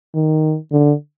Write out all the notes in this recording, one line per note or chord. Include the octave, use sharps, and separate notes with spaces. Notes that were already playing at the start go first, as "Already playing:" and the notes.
D#3
D3